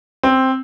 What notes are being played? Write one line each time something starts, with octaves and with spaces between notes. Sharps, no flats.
C4